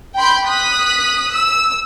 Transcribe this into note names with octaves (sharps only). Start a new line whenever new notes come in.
G5 B5 C6 G6
D#6 F#6 B6
E6